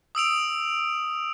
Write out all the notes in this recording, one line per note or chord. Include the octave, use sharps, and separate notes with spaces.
D#6 E6 D7 F7